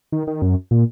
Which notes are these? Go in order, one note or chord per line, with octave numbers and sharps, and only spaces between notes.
D#3
D#3
F#2
A#2